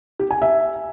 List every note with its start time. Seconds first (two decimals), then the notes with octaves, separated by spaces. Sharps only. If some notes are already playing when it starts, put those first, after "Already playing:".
0.20 G4
0.31 G#5
0.42 E5